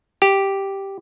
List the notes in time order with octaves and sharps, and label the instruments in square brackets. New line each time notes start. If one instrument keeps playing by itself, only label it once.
[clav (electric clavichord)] G4